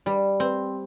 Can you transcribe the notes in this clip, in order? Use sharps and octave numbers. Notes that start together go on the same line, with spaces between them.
G3
C4